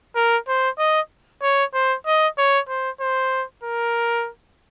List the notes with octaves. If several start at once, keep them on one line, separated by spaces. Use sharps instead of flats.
A#4
C5
D#5
C#5
C5
D#5
C#5
C5
C5
A#4